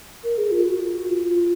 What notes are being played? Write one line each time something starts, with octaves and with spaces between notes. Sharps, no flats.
A#4
G#4
F4
F#4
F4